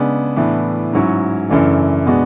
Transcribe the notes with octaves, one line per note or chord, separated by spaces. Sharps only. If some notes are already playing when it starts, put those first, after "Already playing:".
Already playing: C#3 G#3 B3 D4
A2 E3 B3 D4
G#2 F#3 C#4 E4
F#2 C#3 E3 A3 D4
B2 G#3 B3 D4 F#4